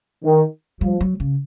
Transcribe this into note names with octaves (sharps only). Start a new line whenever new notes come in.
D#3
F3 G3
F#3
C#3